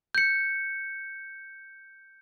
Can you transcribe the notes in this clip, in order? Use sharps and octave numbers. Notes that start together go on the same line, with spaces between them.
G6 C#7